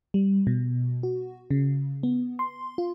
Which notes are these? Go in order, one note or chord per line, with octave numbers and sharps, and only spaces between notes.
G3
B2
F#4
C#3
B3
C6
F4